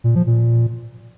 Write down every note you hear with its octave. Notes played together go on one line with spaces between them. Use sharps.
A#2
F3
A#2